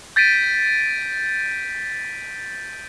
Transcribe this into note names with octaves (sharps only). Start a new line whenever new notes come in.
G6 A6 B6 D7 D#7